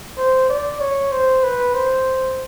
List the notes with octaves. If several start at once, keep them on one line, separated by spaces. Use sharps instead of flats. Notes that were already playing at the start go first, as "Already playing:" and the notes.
C5
D5
C#5
C5
B4
C5